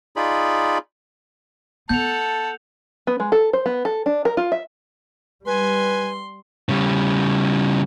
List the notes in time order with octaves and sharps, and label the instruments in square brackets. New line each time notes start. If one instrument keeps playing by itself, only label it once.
[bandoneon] D#4 F4 G#4 D5 B5
[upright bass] B3 [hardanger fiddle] A4 F#5 [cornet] A5 [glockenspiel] G6 F7
[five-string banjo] B3
G#3
A4
C5
B3
A4
D4
A#4
F4
E5
[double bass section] G3 [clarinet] B4 [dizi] G#5 [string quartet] C6
[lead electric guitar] C#3 G3